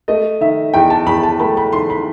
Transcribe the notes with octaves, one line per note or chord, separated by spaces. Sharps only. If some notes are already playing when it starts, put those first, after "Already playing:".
A3 D#5
D#3 E5
E2 G5
A5
E2 B5
A5
A3 B5
B5
D#3 C6
B5